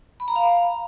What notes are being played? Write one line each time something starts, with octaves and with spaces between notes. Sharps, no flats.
B5
A#5
F5